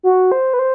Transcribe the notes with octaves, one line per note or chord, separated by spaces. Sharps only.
F#4
C5
B4
C5